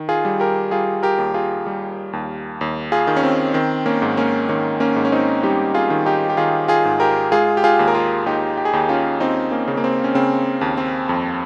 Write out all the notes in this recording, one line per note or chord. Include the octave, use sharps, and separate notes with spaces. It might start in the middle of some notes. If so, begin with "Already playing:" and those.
Already playing: D#3
F4 G#4
G3
G4 A#4
G3 F4 G#4
G4 A#4
D#2
F4 G#4
G3
D#2
D#2
F4 G#4
D#3
C#4
C4
D#3 C4
A#3 C#4
G#2
A#3 C#4
D#3 A#3 C#4
A#3 C#4
G#2
C#4
C4 D#4
G3 D#4 G4
F4 G#4
D#3
D#4 G4
G4
D#3 F4 G#4
F4 G#4
G#2
G4 A#4
G#3 F4 G#4
G4
F4 G#4
D#2
A#4
F4 G#4
D#2 D#4 G4
G4
G#4
D#2 D#4 G4
C#4 F4
D#2 C4 D#4
A#3 C#4
C#3
A#3
C4
C#4
C#3 C4
D#2
C4
F2